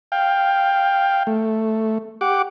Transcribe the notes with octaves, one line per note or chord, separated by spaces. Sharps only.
F5 G5
A3
G4 F#5 D6